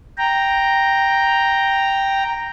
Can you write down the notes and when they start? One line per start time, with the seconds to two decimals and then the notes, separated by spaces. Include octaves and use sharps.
0.18 G5 A#5